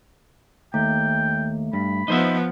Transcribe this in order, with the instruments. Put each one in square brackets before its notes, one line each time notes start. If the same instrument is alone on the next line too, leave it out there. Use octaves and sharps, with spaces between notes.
[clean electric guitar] D#2 [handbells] A3 [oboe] G5
[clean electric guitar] G2 [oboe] B5
[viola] F3 B3 [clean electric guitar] D#4 C5 E5